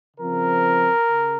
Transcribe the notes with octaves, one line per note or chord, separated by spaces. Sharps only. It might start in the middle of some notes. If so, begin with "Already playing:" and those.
C#3 F3 C4 A#4
C#3